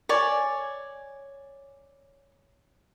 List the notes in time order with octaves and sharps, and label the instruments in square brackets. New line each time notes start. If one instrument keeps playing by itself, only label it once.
[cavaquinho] C#5 D5 G#5